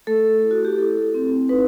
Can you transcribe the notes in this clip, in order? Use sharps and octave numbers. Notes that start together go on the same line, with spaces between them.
A3 A4
E4
F#4
G4
E4 A4
C4
D#4 B4